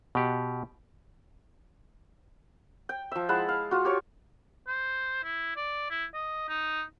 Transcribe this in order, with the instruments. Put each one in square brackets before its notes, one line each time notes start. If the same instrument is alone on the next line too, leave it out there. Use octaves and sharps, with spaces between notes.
[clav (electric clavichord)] B2 G4 F#5
[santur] G5
F3 E5
G#3 E4 F#5 A5
F5
F4 F#4
G4 C#5 C#6
[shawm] C5
E4
D5
E4
D#5
D#4